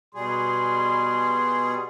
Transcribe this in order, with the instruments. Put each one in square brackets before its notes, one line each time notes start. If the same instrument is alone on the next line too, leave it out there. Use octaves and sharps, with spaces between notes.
[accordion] B2 G3 G#4 [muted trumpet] C6